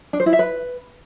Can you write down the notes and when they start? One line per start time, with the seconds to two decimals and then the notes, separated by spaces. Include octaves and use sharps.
0.13 D4
0.20 C5
0.26 E4
0.33 E5
0.39 B4